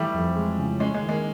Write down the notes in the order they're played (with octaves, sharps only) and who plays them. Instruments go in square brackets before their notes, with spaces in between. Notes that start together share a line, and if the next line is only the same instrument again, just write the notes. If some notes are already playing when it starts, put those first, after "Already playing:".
Already playing: [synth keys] E3 [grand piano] G3 A3
[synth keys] F2
G#3
C#3
[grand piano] G#3 [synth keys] C#4
[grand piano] G#3
[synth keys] D#3
[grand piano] G#3 A#3